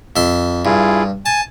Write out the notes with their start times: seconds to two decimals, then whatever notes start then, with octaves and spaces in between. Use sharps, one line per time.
0.16 F2 E5 C6
0.65 G2 E4 F4 G#4
1.26 G#5 A5